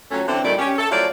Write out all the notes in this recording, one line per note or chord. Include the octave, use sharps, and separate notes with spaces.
F2 F#3 A3 C#4
D3 E3 C4
A#2 D#3 G3 A3 D5
C#4 G4
A4
F3 F#3 A3 C#4 E4 D5